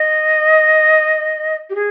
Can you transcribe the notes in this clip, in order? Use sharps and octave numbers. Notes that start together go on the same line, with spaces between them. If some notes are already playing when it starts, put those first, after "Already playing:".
Already playing: D#5
G4
G#4